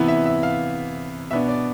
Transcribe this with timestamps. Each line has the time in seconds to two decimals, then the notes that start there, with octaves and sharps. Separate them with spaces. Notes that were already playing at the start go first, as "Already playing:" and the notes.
Already playing: C3 E3 B3 E4
0.08 E5
0.26 E5
0.43 F5
1.31 B2 B3 D4 E5
1.48 D5